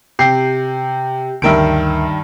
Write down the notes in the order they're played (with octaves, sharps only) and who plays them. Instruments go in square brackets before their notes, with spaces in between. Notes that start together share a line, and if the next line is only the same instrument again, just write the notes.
[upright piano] C3 C7 [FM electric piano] G4 G5
[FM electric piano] D2 A#4 E5 [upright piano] G2 D#3 D7